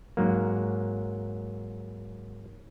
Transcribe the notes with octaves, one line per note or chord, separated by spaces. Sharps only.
G#2 F#3 A#3